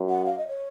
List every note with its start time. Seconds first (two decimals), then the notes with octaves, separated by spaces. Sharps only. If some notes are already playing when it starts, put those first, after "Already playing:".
Already playing: F#2
0.09 F#5
0.26 F5
0.38 D#5
0.48 C#5